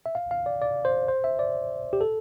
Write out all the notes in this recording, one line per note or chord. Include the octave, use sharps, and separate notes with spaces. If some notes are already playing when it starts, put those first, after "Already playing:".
E5
F5
F5
D5
D5
C5
C5
E5
D5
G4
A4